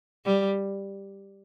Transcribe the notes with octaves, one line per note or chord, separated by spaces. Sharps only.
G3